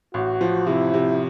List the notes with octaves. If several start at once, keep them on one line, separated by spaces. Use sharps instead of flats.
A1 F#4
F3
C3 E4
C3